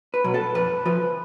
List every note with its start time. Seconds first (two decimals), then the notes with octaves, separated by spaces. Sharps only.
0.14 B4
0.24 B2 F#3
0.34 A4
0.55 F2 B4
0.85 F3 B4